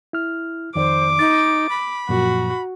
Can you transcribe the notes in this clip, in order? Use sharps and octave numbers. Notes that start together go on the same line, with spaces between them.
E4 F6
F2 D#3 C5 D5 D6
D#4 A6
B5
F#2 A#2 F3 F#4